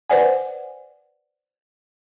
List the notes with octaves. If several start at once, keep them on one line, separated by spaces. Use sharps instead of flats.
B4 C5 D5 F#5 G#5